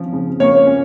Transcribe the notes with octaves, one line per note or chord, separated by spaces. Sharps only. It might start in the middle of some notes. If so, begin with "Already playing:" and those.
Already playing: F3 C#4
C#3
A#3 C#5
C#4